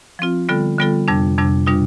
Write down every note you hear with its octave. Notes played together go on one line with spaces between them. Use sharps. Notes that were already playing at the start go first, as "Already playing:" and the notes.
F3 C4 F4
D3 G3 B3 F4 A4
D3 G3 B3 F4 A4
F2 C3 G3 D4
F2 C3 G3 D4
B2 G3 D4 F4